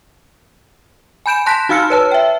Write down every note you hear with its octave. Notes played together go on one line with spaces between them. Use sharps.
G#5 B5 G6 D7 E7
A5 C6 F#6 A#6 B6 E7
D#4 F#4 F5 E6 F6 C#7
B4 C#5 A5 E6
E5 G5